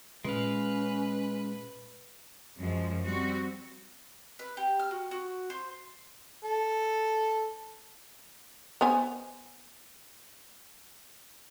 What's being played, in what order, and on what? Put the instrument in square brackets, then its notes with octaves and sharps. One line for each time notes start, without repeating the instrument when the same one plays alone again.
[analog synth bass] A#2 [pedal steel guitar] G#3 F5 [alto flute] C#4 [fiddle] B4
[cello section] F#2 F3 G#3
G3 C4 F#4
[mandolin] B4
G4
F6
F#4
F#4
C5
[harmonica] A4
[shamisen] B3 C5 G#5